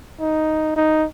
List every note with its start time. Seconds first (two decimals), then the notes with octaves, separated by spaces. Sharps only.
0.20 D#4
0.76 D#4